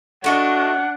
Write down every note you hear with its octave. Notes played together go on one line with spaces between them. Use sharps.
A3 D4 F#4 D#5 F#5